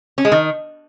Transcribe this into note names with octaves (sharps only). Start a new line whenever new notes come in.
C#4
G#3
D#3